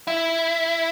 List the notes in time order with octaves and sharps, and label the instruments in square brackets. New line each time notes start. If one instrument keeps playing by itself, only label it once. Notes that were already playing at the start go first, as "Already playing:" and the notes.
[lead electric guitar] E4